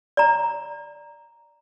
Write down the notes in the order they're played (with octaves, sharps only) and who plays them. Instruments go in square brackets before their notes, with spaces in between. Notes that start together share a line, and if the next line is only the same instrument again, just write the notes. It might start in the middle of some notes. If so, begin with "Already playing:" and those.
[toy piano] D5 A#5